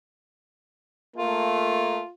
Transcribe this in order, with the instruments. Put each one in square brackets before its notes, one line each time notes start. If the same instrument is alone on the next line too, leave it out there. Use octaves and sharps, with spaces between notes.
[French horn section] A3 A#3 [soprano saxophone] F4